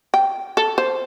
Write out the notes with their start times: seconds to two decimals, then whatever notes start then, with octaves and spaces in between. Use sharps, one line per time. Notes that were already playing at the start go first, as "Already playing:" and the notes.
0.14 G5
0.57 A4
0.78 C5